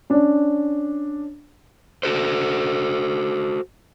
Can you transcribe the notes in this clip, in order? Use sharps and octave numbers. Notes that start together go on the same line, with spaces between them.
C#4 D4
F#4 A4 C5